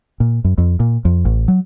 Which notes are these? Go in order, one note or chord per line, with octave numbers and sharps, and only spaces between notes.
A#2
F#2
F2
A#2
F2
A1
F#3